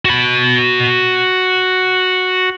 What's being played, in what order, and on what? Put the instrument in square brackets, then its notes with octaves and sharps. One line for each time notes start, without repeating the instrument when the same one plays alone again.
[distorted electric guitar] F#4 B5